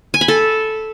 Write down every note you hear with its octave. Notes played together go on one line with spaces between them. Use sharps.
G#5
B5
A4